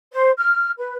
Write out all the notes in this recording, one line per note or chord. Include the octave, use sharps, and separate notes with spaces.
C5
F6
B4